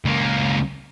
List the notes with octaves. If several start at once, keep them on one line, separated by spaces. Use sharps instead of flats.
C#2 A#3